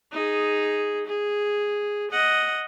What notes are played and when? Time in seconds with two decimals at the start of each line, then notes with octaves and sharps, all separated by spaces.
0.13 D#4 G#4
1.07 G#4
2.11 D#5 F#5